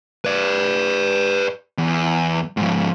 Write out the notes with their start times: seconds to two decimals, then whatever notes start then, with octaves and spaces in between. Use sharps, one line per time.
0.24 B4 D5
1.78 E2
2.57 G#2 F3